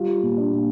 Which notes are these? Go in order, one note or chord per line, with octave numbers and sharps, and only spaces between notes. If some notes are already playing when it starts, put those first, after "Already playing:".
Already playing: G3 F4
A#2
D4
A#2